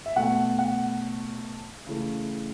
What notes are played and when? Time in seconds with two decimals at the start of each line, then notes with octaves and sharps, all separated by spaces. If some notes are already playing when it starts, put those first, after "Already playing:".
0.06 E5
0.16 B2 A3 F#5
0.59 F#5
1.87 C#3 E3 A3